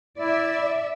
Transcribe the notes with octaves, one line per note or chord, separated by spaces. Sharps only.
E4 D5 E5